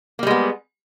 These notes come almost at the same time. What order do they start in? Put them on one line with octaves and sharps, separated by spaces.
A#3 G3 G#3 B3